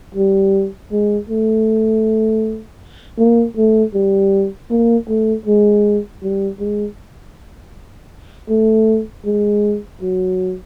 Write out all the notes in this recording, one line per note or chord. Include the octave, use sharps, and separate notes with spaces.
G3
G#3
A3
A#3
A3
G3
A#3
A3
G#3
G3
G#3
A3
G#3
F#3